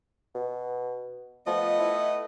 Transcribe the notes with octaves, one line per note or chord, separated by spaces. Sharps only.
B2
F3 A3 B3 D#5
E4